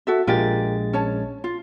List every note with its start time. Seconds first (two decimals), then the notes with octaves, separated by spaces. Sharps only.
0.07 F#4 A4 E5
0.27 A#1 G#3 F4 G4 A#4 A6
0.93 C#4 C#5 A5
1.44 F4